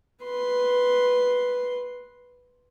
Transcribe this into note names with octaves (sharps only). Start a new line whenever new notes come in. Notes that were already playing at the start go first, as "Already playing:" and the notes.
B4 C6